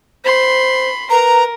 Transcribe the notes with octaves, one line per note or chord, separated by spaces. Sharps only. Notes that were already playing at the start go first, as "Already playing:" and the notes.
C5 B5 C6
A#4 B4 A#5